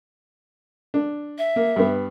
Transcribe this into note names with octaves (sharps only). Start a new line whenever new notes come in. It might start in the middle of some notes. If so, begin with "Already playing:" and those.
D4
E5
A#3
G2 B3